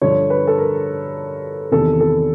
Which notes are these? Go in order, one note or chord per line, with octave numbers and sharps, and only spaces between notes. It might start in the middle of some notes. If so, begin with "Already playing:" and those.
G2 D3 F3 C#5
B4
A4
A#4
E2 C3 D#3 A4
A4